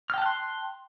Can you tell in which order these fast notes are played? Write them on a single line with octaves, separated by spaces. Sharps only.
F6 G5 A5 F#6 C6